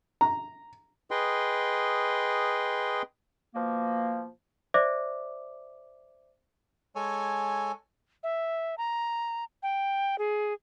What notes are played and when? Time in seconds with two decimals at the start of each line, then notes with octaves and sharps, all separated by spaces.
0.21 A#5
1.11 G#4 B4 D#5 G5 C6
3.55 B2 F3 A#3
4.74 C5 D5 E5 D6
6.95 G#3 A4 C#5 G#5
8.23 E5
8.78 A#5
9.63 G5
10.18 G#4